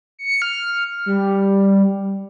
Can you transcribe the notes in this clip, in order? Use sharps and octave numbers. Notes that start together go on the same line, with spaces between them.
C#7
F6
G3